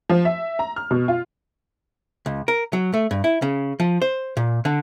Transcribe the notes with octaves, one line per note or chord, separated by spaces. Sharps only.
F3
E5
A#5
F6
B2
F4
C#2
A#4
F#3
A3
G2
E4
C#3
F3
C5
A#2
D3